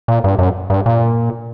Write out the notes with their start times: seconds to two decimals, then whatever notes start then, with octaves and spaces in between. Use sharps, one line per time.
0.08 A#2
0.24 G2
0.39 F#2
0.70 G2
0.86 A#2